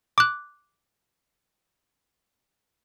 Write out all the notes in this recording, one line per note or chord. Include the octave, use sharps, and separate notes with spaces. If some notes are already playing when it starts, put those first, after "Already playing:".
D6 F#6